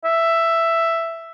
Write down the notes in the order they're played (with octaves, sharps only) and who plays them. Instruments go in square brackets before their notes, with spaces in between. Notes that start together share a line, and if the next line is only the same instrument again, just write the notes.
[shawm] E5